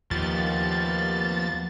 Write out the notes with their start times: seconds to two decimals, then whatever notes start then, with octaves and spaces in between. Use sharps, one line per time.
0.11 D#2 F3 A#3 B3 G4 A6